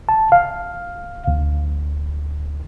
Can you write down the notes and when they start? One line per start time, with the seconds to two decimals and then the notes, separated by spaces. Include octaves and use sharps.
0.09 A5
0.32 F5
1.28 D2